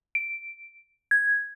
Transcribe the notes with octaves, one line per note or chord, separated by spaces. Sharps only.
D7
G#6